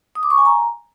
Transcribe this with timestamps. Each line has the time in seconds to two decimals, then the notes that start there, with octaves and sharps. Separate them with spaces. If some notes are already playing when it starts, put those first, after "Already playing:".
0.15 D#6
0.23 D6
0.30 C#6
0.38 G#5
0.45 A#5